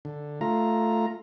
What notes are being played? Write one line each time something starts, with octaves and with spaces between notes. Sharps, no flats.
D3
A3 F4 A#5